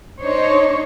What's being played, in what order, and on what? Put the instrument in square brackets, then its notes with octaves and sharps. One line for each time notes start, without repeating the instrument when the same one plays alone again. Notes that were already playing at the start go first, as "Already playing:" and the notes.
[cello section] D4 D#4 C5 C#5